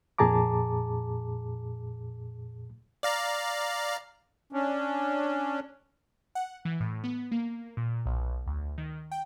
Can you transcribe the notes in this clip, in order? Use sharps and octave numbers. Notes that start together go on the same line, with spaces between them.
F2 A#2 G#4 A5 A#5 D6
D5 F5 A#5
C#4 D4
F#5
E3
A2
B3
A#3
A#2
B1
D2
D#3
G5